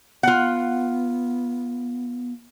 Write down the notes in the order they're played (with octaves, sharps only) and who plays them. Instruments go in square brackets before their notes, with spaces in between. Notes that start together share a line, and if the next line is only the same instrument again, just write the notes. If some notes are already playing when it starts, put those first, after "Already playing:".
[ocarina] B3 [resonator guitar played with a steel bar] F4 F#5